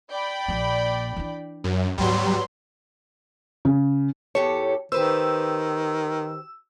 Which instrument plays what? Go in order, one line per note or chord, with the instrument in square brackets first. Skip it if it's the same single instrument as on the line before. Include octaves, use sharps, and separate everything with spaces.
[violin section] D5 G5 B5
[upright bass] A#1 A#2
E3 D4
[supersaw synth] F#2
[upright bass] D2 G#2 [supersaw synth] F#3 G3 [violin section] B3 C6
[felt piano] C#3
[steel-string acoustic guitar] E2 G4 A4 [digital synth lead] C#5
[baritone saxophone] D#3 [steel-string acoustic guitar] G4 B4 C5 [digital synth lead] E6